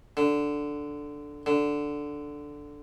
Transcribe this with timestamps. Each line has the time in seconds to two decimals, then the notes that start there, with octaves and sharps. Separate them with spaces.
0.17 D3
1.46 D3